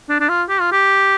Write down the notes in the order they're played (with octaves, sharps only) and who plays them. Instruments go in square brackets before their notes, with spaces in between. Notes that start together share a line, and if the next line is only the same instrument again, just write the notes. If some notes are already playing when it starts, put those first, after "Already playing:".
[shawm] D4
D4
F4
G4
F4
G4